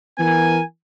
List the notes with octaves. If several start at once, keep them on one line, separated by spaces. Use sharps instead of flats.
E3 B3 A#4 G#5